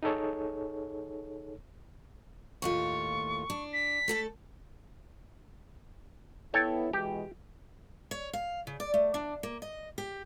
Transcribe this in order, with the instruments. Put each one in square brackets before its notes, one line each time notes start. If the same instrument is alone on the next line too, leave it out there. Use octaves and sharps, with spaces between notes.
[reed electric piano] D#4 G#4 A4 C#5
[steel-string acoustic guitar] D#2 A2 F4 [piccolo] C#6
[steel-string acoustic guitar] D4
[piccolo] B6
[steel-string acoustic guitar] A3 A4 A5
[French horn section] B3 E4 [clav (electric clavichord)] A4 C#5 G5
[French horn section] B2 E3 G#3 [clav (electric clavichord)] G4
[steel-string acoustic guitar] C#5
F5
C#3
D5
A3
D4
A#3
D#5
G4